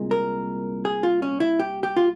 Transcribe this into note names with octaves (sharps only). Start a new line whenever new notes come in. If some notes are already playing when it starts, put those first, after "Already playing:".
Already playing: C2 A#2 G#3
A#4
G#4
F4
C#4
E4
G4
G4
F4